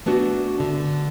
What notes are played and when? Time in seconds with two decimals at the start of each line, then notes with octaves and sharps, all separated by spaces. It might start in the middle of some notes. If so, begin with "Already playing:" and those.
0.06 A3 B3 D4 F#4
0.60 D3